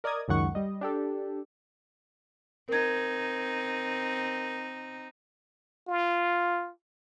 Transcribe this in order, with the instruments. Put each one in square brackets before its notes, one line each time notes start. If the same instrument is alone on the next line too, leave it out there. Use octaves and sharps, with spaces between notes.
[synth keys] A#4 D5 D#5 D#6 G#6
C#2 F#2 D#3 F#5 C#6
G3 D#5
D4 G4 A4
[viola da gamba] C4 D#4 [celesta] A#4 G#6
[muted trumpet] F4